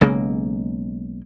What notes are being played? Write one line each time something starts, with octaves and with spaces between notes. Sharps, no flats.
B1 C#3 G#3 A#3